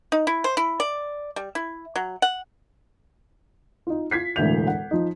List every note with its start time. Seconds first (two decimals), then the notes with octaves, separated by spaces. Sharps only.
0.12 D#4
0.27 E4
0.44 C5
0.57 E4
0.80 D5
1.36 G3
1.55 E4
1.96 F#3
2.22 F#5
3.87 D#4 F4
4.11 F4 G#6 B6 C7
4.36 E1 D2 A2 E5 G6 F7
4.67 F#5
4.91 F3 D#4